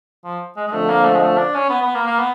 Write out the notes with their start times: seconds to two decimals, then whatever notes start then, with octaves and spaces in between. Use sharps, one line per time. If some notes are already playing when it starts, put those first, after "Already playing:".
0.24 F3
0.57 G#3
0.67 G#3
0.72 F2 D3 F3 A3
0.90 A#3
1.05 A3
1.15 G#3
1.22 A3
1.38 D4
1.55 C#4
1.70 B3
1.82 B3
1.95 A#3
2.07 A#3
2.19 B3